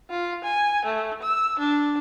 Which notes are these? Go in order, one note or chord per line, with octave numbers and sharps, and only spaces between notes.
F4
G#5
A3
E6
D4